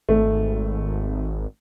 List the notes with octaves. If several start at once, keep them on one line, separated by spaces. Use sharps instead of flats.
G#1 A3